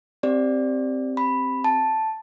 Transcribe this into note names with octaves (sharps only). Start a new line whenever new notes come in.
C4 G4 D5
B5
A5